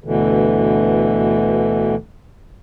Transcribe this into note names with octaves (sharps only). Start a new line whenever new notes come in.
D2 B2 D3 E3